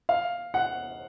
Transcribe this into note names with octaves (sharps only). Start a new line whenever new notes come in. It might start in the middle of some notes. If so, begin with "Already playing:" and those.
F5
F#5